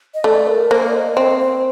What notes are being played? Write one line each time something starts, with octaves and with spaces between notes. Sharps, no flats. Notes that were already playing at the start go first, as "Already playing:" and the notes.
D#5
A3 D5
A#4
A#3 C5
D5
D#5
C4 C5
C5